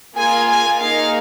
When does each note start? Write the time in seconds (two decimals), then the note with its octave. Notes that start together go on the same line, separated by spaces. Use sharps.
0.17 A#3 F4 G#4 G#5
0.49 G#5
0.81 A#3 D#4 G#4 F5